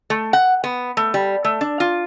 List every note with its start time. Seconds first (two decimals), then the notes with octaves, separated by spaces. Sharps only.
0.10 A3
0.33 F#5
0.64 B3
0.97 A3
1.14 G3
1.45 A3
1.61 D4
1.80 F4